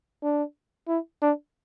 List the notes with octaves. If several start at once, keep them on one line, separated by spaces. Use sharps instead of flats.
D4
E4
D4